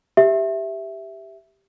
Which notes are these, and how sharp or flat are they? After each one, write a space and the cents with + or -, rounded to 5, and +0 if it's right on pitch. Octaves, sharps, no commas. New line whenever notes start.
G4 +0 E5 +0